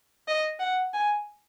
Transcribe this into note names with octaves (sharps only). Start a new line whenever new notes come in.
D#5
F#5
G#5